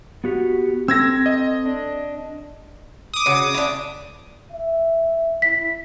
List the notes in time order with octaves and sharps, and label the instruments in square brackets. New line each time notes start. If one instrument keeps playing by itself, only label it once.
[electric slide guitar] B3 F#4 G4
[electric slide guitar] C4 A4 [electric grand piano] E6 G#6 A#6
[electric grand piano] D#5
[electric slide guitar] D4
[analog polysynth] D6 D#6
[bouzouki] C#3 F#4
D4 E4
[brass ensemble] E5
[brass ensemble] E4 [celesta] B6